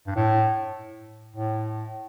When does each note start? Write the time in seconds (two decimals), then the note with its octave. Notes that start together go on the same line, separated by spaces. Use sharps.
0.07 G2
0.16 A2
1.36 A2